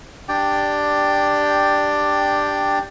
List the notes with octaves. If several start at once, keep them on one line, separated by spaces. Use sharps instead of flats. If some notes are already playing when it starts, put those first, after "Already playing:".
D4 G4 D5 G5